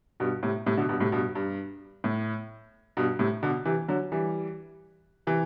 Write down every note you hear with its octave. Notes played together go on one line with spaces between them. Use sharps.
G2 B2
A2 C3
A2 C3
B2 D3
G2 B2
A2 C3
G2 B2
G2
A2
G2 B2
A2 C3
B2 D3
C3 E3
D3 F#3
E3 G3
C3 E3